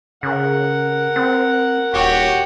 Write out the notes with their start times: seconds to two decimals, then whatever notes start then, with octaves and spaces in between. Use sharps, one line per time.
0.23 C#3 A#4 F#5
1.16 C4
1.94 D#1 F#4 G4 C#5